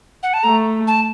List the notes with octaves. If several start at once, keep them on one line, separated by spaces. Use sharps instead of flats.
F#5
A5
A3 A#5
A5